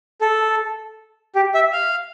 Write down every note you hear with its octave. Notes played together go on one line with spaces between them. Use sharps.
A4
G4
E5
F5